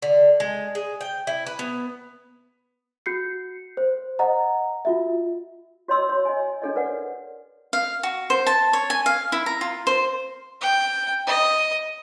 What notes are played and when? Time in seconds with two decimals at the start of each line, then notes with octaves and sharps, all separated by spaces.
0.02 D3
0.40 G#3
0.75 G#4
1.01 G5
1.27 E4
1.46 B4
1.59 B3
3.06 F#4 G6 C7 C#7
3.77 C5
4.19 D#5 F#5 A#5
4.85 F4 F#4 E5
5.88 F#4 C#5 D#5 C6 E6
6.09 C#5 C6
6.25 D#5 G#5
6.62 D4 G#4 A4 C#5 D#5
6.76 A#4 B4 D5 F#5
7.73 F5
8.03 F#4
8.30 C5
8.47 A5
8.73 C#5
8.90 G#5
9.06 F5
9.32 E4
9.46 A#5
9.61 F4
9.87 C5
10.61 G5
11.27 D#5